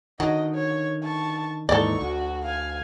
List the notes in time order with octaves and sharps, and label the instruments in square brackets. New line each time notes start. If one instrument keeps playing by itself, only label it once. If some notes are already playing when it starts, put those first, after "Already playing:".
[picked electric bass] D3 D#3 [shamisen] F#3 [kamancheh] D#5
[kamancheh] C#5
A5 C#6
[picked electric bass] D#2 G#2 E3 [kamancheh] D#4 C#6 [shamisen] A4 D5
[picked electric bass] D2 [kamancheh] F#4
[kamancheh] F5 G#5